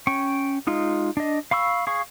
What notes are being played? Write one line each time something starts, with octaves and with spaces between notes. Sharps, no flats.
C#4 G5 C#6
G#3 D#4 F4
D4 D#5
F5 B5 C#6 E6
G#4 F5 C#6